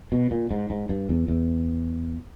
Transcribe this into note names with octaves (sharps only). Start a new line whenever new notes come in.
B2
A#2
G#2
G#2
G2
E2
E2